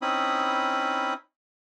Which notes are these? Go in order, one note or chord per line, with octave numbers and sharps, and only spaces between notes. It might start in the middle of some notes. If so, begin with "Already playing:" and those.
C4 C#4 D#4 E4 B5 D#6